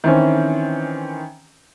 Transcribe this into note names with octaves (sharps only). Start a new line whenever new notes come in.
D#3 E3 C4 C#4